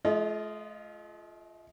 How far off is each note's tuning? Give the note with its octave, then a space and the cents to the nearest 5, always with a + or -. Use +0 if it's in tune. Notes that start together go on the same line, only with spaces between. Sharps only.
A3 -45 F4 -10 D#5 +0